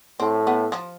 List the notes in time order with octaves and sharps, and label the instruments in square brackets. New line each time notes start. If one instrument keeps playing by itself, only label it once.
[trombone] A2 [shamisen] C4
[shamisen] B3
F3